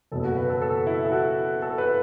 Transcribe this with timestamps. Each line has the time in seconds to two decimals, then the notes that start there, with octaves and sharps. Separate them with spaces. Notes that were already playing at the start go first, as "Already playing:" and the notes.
0.12 F#1 E2 B2 B3 A4
0.25 F#4
0.37 B4
0.49 A4
0.62 A4
0.87 E4
1.05 A4
1.12 F#4
1.62 A4
1.78 B4